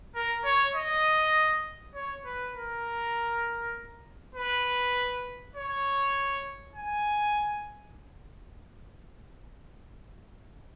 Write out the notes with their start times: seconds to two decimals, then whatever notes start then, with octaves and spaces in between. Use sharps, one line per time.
0.15 A#4
0.45 C#5
0.74 D#5
1.94 C#5
2.25 B4
2.55 A#4
4.35 B4
5.56 C#5
6.75 G#5